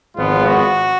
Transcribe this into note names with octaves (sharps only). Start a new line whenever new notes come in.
G#1 G#2 F3 G#3 B3 F4
F#4